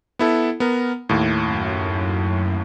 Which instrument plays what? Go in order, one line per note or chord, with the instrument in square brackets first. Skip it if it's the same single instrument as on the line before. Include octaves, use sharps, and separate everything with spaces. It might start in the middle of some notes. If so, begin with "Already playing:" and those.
[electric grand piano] B3 E4 A4
B3 A#4
D#2 A2
[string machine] F#2